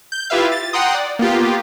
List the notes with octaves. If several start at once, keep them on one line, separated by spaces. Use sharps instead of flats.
G6
E4 F4 G4 B4 E5 F5
A6
F#5 G5 A#5 C6 D#6
D5
A#3 B3 F4 G4